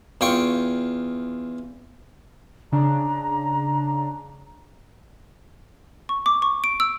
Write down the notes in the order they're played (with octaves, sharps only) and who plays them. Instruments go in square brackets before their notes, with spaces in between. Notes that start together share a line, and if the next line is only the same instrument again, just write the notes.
[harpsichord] E2 F4 G5 C#6
[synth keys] C#3 D4 [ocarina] A#5
[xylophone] C#6
D6
C#6
D7
E6